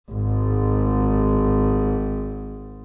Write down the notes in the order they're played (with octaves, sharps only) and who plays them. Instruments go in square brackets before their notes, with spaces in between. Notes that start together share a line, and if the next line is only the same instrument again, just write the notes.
[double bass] G#1 G#2